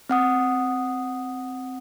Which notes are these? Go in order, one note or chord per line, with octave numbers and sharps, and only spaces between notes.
C4 F#5 D#6